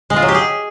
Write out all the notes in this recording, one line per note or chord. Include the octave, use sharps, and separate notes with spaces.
G#3
F4
F#3
G4
G#4